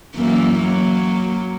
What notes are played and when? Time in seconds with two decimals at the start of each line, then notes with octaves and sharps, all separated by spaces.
0.16 F#2 E3 A#3
0.59 F#3 A#3